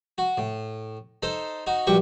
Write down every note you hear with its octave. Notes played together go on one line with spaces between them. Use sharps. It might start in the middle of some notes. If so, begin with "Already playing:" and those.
F#4
A2
D#4 A4 C5
D#4 F#4
A#1 G2 F#4 G4 C#6